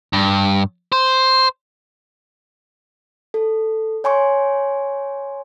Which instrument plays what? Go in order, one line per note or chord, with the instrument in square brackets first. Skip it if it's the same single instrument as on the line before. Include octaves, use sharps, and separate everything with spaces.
[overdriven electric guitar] G2
C5
[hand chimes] A4
C#5 G#5 C6 C#6